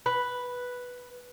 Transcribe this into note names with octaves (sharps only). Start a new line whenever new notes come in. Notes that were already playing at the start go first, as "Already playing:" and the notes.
B4